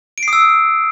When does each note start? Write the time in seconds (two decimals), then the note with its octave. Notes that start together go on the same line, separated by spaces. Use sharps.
0.18 D7
0.23 C7
0.28 D#6
0.33 E6